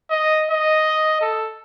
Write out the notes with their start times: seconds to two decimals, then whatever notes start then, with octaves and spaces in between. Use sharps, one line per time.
0.10 D#5
0.51 D#5
1.21 A4